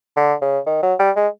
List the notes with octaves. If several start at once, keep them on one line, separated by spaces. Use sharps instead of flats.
D3
C#3
D#3
F#3
G3
G#3